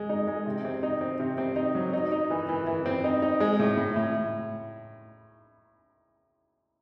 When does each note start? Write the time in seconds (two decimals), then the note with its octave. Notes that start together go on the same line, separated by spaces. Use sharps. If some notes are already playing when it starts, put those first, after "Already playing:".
Already playing: G#3
0.09 D#4
0.27 G#3
0.46 C3
0.65 C4
0.83 D#4
1.01 C4
1.20 C3
1.38 C4
1.56 D#4
1.75 F#3
1.93 D#4
2.12 D#4
2.30 E3
2.49 E3
2.67 E3
2.86 C4
3.04 D#4
3.22 D#4
3.40 G#3
3.59 A2
3.77 A2
3.96 A2